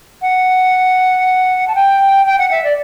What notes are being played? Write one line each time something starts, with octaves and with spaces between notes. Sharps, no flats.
F#5
A5
G5
G5
F#5
E5
D5